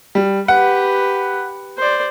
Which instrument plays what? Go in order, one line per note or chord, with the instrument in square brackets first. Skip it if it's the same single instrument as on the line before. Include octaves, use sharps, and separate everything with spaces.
[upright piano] G3
[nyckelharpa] G4 B4 [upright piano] F#5
[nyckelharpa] C5 D5